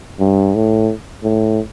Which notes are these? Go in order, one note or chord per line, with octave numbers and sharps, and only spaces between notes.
G2
A2
A2